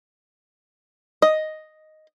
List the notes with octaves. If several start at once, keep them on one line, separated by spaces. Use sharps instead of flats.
D#5